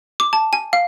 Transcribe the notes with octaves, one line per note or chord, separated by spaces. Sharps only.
D6
A5
G#5
F5